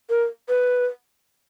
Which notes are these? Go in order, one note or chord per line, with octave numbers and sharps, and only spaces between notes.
A#4
B4